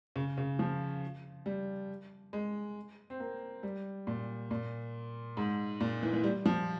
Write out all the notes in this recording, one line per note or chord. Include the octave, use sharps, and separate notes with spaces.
C#3
C#3
F3
G3
G#3
C4
A#3
G3
A#2
A#2
G#2
A#2
E3
E3
G3
F3